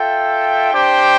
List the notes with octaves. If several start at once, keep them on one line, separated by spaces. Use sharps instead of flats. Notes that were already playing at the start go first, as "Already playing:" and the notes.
Already playing: F4 A4 E5 G5
D4 G4 C5 G5